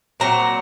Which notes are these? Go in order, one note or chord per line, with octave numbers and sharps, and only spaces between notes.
A#2 F#3 C4 A#5